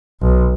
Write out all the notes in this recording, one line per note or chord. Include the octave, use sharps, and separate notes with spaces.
B1